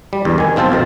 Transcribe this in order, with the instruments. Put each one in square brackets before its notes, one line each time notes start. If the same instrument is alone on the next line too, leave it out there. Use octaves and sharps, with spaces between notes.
[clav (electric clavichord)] G3
E2 G2
D#3 G#5
B1 C4 F4 C5 A5
F2 B2 D#3